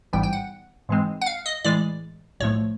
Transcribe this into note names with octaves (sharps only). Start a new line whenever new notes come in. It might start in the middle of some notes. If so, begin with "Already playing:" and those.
A1 G#2 E3 G3 B3 G5
G5
F#5
G#2 E3 G#3 C4
F#5
F5
D#5
A2 E3 G#3 D5
B1 A2 F3 A3 C#5